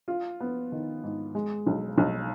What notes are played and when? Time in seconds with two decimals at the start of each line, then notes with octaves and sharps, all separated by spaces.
0.08 F4
0.40 B3
0.72 D#3
1.04 G#2
1.35 G#3
1.66 B1
1.98 B1